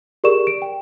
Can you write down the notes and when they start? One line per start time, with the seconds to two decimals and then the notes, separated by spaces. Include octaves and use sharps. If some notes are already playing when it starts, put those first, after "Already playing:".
0.24 G4 G#4 A#4 D5 C#6 E7
0.47 D7
0.62 G5